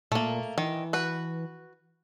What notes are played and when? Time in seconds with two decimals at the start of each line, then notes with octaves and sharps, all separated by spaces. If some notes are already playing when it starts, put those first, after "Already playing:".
0.12 A#2 A3 A#3
0.58 D#3 E3
0.93 F#4 B4